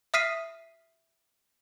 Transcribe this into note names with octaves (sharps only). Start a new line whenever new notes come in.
E5 D#6 F6 B6 C7 D#7